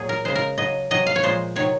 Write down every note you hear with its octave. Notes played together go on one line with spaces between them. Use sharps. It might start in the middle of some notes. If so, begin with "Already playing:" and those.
Already playing: A#2 F#3 G#4
A#4
C#3 G#3 C5
A#4
C#3 F#3 D#5
C3 F#3 D#5
F5
C#5
A#2 F3 G#3 C5
C3 D#3 F#3 C#5